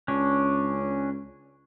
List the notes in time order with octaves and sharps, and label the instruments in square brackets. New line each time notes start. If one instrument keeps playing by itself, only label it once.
[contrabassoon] C#2 [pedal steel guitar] C#4 D4